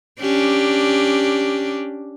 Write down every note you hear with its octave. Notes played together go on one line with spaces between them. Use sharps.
C#4 D4 G4